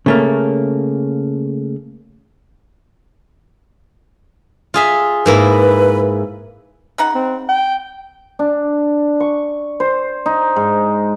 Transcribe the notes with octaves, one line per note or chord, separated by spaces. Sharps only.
C#3 A3 A#3
F4 G#4 E5
G#2 A#3 E4 B4
C#3 D#4 F#5
C4
G5
D4
C#6
C5
D#4
G#2